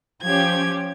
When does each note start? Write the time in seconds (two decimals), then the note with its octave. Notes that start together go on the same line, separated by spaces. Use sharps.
0.22 F3 C#4 G4 G#6